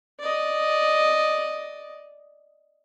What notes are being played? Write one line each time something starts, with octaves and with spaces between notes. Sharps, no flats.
D5 D#5